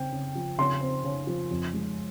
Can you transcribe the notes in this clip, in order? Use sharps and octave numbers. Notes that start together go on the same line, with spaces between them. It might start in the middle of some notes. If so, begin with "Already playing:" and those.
Already playing: C#3 C4 G5
C#3
F3
C#3 C6
C4
C#3
F3
F2
G#3